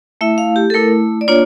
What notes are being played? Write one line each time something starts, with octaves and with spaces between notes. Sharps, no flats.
A3 E4 E5
F5
G4
A4
A3 E4 A#4
D5
A#3 D4 F4 C#5